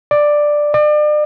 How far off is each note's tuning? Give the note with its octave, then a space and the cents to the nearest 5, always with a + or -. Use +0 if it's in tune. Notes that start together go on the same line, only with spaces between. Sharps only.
D5 +5
D5 +35